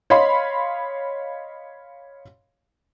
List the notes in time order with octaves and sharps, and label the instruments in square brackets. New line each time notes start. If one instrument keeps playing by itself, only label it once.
[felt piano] C#5 D#5 F5 B5 C6